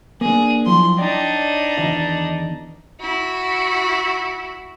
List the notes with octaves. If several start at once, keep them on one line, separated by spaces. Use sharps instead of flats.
A#3 D4 G#4
F3 F#3 E4 C6
D4 D#4 C#5 D5 G5
E2 D#3 D#5
E4 F#4